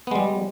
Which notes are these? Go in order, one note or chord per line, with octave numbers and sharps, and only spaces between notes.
G3 G#3 B3